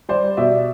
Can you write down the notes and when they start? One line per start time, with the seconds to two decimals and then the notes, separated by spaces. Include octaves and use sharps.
0.09 G3 C5 D5
0.37 B2 D5 E5